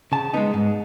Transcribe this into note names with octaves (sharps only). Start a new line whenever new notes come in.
C#3 A5
G#3 B3 D#4
G#2